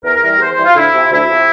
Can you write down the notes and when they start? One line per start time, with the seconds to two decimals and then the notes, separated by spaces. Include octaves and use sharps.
0.04 E2 A#4
0.22 E3 G3
0.39 E2 C5
0.51 C5
0.58 E3 G3
0.64 F4
0.76 D2 E4
0.93 C3 F3
1.11 D2 E4
1.30 C3 F3